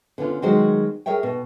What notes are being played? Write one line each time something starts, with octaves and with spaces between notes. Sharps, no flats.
D3 B3 C#4 F4
D#3 F#3 G#3 F#4 C5
G#4 A#4 C#5 E5 G5
B2